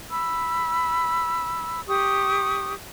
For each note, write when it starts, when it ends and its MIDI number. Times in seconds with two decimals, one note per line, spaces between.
0.10 1.81 83
0.10 1.81 88
1.87 2.74 67
1.87 2.74 85
1.87 2.74 87